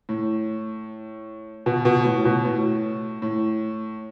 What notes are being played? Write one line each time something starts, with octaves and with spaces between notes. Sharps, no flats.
A2
B2
B2
A2
B2
A2
A2